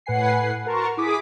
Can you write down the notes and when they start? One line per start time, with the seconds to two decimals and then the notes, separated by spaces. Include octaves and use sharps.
0.06 A2 B4 F#5 G#5 C7
0.66 F#4 A#4 A5 A#5 C6 C#6
0.97 E4 G#4 D6 D#6 B6